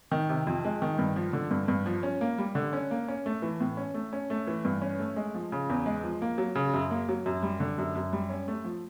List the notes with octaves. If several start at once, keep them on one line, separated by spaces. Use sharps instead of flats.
D#3
C3
F2
G#3
D#3
G2
F3
D3
G2
G2
F3
C#4
A#3
G3
D3
C#4
A#3
C#4
A3
E3
A2
C#4
A3
C#4
A3
E3
G2
C#4
A3
G#3
F3
C#3
E2
G#3
F3
A#3
F#3
C#3
F#2
A#3
F#3
F#2
G3
D3
F#2
F#2
G3
C#4
A3
F3